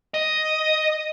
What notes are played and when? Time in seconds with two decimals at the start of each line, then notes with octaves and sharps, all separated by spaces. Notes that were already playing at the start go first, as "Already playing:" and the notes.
0.14 D#5